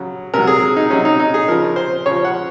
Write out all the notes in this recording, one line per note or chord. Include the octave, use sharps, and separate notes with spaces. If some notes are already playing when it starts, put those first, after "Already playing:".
Already playing: C#3 F#3
C3 F#3 A#4
G#4
D#4
C3 F#3 C#4
D#4
D#4
G#4
C#3 F3 A#4
C5
C#3 F3 C#5
F#5